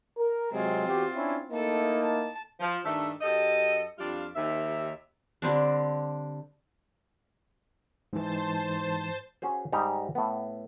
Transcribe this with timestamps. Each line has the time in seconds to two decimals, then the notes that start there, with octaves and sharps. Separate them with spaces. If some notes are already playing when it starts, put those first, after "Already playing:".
0.18 A#4
0.52 C3 F#3 G#3 C4 F4
0.87 E2 F#4 G4
1.16 C#4 D4 E4
1.52 A3 A#3 D#4 E4 A4
2.03 A5
2.60 F3
2.85 G2 D#3 A3 D4 A4 E5
3.21 F#2 G4 A4 D#5
3.98 F2 G3 D4 F4 F5
4.36 D#2 D#3 G4 E5
5.42 D3 G3 C4 D4
8.13 G#2 E3 C5 A5
9.42 C#4 F#4 G#4 C5
9.72 G#2 G3 D#4 G4 D#5 A#5
10.15 A2 B3